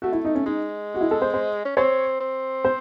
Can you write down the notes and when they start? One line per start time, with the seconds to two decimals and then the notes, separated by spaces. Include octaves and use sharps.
0.02 A3 F#4
0.12 E4
0.25 D#4
0.35 C#4
0.46 G#3 D#4
0.94 F#4
1.01 E4
1.11 A4
1.22 C5
1.34 C5
1.65 C#4
1.77 C4 C#5
2.20 C4
2.65 C5